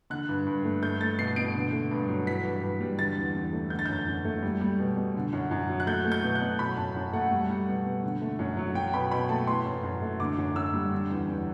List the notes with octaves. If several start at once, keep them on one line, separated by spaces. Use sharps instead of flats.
D3 F#6
G2
G2
A3
A3 G6
A3 A6
B2 C7
B2 D7
D3
A3
G2
F#3
E3 B6
G2
G2
G3
D3 A6
E2
E2
A3
D3 G6
A6
F#2 G6
F#2
A3
G3
G3
B2
B2
D3
F#2
F#2
F#3
F#6
A3 G6
A3
G6
B2
F#6
B2
F#3 B5
F#2 A5
F#2
A3 F#5
G3
G3
B2
B2
D3
A3
F#2
F#3
F#3 G5
B2 B5
B2 B5
A3 A5
E3 C6
F#2
F#2
A3
D3 D6
F#2
F#2 E6
G3
D3
E2
E2